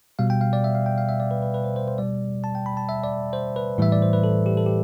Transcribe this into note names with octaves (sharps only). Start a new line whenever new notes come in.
B2 G3 F5
G5
F5
D5
E5
F5
G5
F5
E5
D5
B4
B4
B4
C5
C5
C5
B2 G3 D5
A5
G5
B5
A5
E5
D5
C5
B4
A2 E3 G3 E5
D5
C5
B4
A4
G4
A4
G4